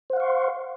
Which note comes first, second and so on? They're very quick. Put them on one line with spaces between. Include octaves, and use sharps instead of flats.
C5 F#5 F5 C#6 C6